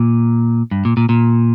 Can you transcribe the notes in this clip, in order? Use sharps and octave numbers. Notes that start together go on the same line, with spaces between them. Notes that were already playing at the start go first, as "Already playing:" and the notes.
Already playing: A#2
G2
A#2
A#2
A#2